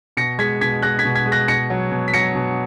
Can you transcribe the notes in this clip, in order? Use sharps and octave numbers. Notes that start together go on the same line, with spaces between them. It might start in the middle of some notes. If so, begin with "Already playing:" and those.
B2 A#6 C#7
G#3 G#6 B6
B2 G#6 B6
G#3 F#6 A#6
G#6 B6
B2
G#6 B6
G#3
F#6 A#6
B2 A#6 C#7
F#3
B2
B6
F#3 A#6 C#7
B2